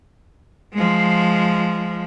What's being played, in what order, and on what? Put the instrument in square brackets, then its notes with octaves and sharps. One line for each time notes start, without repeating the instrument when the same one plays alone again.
[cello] F3 G#3